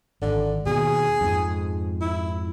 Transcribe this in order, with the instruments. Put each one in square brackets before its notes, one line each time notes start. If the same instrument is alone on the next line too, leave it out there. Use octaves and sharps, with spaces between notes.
[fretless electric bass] G#1 [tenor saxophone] D3
[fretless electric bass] D#2 B2 [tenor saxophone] G#4
[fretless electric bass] F2 G#2
[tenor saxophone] E4